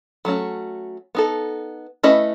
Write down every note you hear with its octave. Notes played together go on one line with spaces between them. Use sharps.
F#3 A3 C#4 F#4
B3 D#4 A4
A3 C#4 E4 B4 D#5